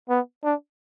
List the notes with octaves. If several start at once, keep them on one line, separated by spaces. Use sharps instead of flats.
B3
D4